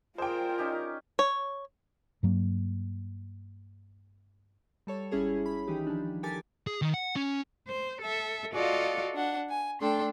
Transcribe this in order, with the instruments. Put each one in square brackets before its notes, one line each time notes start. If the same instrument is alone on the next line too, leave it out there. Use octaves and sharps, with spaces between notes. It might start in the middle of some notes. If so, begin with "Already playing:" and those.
[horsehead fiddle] F4 A#4 [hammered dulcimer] G#4 D5 [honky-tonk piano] C5 G5
[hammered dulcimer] C#4 D#4 G4
[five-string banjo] C#5
[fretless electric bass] G2 F#3 A#3
[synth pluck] G3 A4 C#5
G#1 G3 C#4 E4 G#4 C#5
B5
D#3 E3 D#4 G4
F3 D4
G4 A4 A#4 G#5 D6 A6
[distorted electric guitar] G#4
D#3
F#5
C#4
[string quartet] C5
A4 E5
F4 F#4 A4 D5 D#5 F5
D4 F#5
G#5
A3 D4 A4 G5 C6